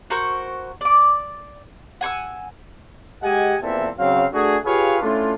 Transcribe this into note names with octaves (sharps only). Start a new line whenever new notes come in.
F#4 A#4 C5 C#6
D5 D6
F#5 G#5 C#6 E6
G#3 G4 D#5 F#5 G#5
E2 A#2 E3 C4 A4 E5
C#3 F#3 C4 F5
A3 D4 F#4 G#4
F4 G4 G#4 B4 C#5 F5
A3 C#4 D4 E4 F4